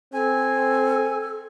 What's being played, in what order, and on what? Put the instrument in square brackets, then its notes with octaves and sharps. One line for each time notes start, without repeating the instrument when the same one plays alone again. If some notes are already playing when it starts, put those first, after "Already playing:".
[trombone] C4 [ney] A4 [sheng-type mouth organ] G#5